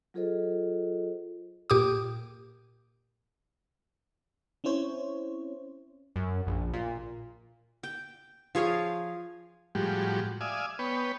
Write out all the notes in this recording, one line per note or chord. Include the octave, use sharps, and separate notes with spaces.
F#3 F4 G#4 A4 C5 D#5
A#2 G4 D6 D#6
C4 C#4 E4 C5 C#5
F#2
A#1
A#2
G5
F3 G#4 C#5 F5
A2 F3 G3 G#3 F#4 G4
D5 E5 F5 G#5 D#6
B3 B4 C#5 G5